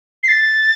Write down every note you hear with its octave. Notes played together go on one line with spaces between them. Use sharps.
C7
A6